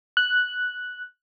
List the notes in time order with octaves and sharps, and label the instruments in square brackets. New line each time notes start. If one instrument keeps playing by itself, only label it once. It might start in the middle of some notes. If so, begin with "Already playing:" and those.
[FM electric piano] F#6